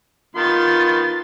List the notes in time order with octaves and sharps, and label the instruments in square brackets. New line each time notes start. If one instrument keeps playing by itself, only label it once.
[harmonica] D#3 B3 C6 [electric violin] F4 A6